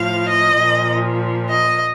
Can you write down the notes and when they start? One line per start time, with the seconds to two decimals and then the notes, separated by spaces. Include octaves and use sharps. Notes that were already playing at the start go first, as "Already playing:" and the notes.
Already playing: A2 F3 F5
0.29 D#5
0.59 A#2 F3
1.49 D#5